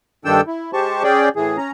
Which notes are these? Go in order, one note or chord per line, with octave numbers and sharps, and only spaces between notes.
G2 D#3 D4 A4 G5 E6
E4
G#3 G4 C5 A5 C#6
C#4 G#4 D5 G5
A2 E3 G#4
C#4 A#5